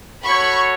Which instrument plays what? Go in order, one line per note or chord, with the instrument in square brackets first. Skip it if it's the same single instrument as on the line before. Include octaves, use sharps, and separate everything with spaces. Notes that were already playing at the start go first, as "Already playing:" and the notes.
[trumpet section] F#4 A4 C#5 [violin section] B5 C#6